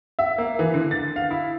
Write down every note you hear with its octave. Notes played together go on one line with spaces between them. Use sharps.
E5
A#3
E3
D3
A6
F5
E4